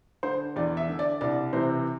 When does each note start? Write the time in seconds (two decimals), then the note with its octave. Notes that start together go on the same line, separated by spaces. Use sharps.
0.23 D3 C5
0.56 E2 D5
0.77 E5
0.88 D3
0.99 D5
1.21 C2 D5
1.53 C3 E3 C5